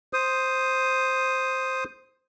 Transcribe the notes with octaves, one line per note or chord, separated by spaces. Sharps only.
C5 D#6